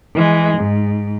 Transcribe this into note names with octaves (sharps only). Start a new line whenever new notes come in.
E3 G#3
G#2